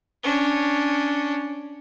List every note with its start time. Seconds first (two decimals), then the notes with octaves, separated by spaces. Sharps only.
0.23 C#4 D4